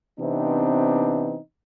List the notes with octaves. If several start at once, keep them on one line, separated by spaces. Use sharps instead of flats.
C3 E3 B3 C4 D4 D#4